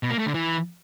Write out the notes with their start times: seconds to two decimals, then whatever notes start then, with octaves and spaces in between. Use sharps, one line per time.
0.03 B2
0.11 A#3
0.19 A3
0.26 D3
0.34 E3